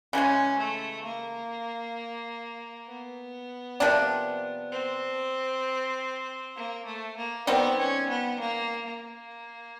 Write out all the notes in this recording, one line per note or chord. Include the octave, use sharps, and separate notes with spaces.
C#3 E3 G#3 C#4
A3
A#3
B3
C3 F3 A#3 D4
C4
A#3
A3
A#3
D#3 G3 B3 C4
C#4
B3
A#3
A#3